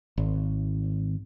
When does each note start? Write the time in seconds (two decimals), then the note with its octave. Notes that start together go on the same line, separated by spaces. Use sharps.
0.18 G#1